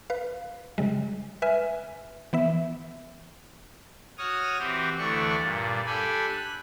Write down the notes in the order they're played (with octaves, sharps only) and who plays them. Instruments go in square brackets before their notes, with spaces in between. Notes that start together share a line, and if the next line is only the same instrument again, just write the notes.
[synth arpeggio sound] B4 F5
C#3 G3 G#3
B4 E5 G#5 F6
E3 B3 E5
[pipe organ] F#4 C#5 D#6 F6
E3 C4 F#4 G4
D2 E3 A3 D4 D5 C#6
G2 A#2
D4 G4 A4 G#5 B5
F#6